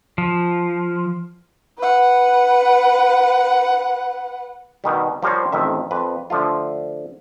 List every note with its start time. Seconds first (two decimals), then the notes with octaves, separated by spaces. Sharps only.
0.18 F3
1.78 B4 F#5
4.84 B2 D#3 G3
5.22 F3 G3 A#4 C5 C#5
5.52 A1 F2 D#3 E5
5.91 F2 B4
6.30 D3 F3 A3 F4